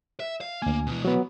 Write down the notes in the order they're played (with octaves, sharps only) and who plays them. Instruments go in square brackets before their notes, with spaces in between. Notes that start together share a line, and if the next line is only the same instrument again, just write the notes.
[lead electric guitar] E5
F5
[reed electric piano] D2 G#5 [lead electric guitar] A#3
[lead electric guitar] B2 E3
[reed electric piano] F#3 B3